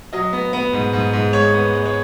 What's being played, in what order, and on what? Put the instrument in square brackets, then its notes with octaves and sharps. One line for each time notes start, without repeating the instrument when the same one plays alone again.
[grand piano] F#3 D#5
B3
B3
G#2
G#2
G#2
G#3 C#5
B3
G#3
C#5